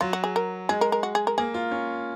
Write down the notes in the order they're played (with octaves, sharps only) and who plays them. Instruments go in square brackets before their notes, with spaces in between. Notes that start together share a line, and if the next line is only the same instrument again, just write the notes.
[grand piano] F#3 [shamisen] F4
[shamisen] F#4
G#4
A#4
[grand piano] G#3 [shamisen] G#4
[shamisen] A#4
A#4
F#4
G#4
A#4
[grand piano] A#3 [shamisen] G#4
[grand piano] F4
C#4